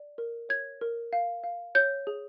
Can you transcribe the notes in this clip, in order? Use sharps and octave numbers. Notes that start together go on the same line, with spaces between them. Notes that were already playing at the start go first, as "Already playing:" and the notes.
Already playing: D5
A#4
C#5 G#6
A#4
F5
F5
C#5 G6
G#4